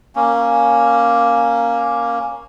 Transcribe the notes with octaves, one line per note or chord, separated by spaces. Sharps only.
A#3 C#4